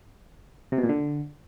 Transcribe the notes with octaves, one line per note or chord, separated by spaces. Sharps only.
C3
B2
A#2
D3